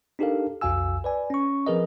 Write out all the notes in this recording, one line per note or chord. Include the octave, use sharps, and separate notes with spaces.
D4 D#4 G4 A4 A#4 F5
B1 F2 F#4 F5 G#5 E6
B4 D5 G#5
C#4 C#6
F3 C4 G#4 A#4 B4 D#5